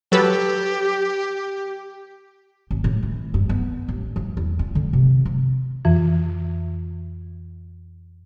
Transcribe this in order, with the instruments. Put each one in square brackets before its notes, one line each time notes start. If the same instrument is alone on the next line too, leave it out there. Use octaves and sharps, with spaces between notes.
[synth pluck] F#3 A4 B4 [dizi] G4
[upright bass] G#1
A2
E3
G2
B3
A1
F3
E2
F4
D3
C3
F3
[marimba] F2 E3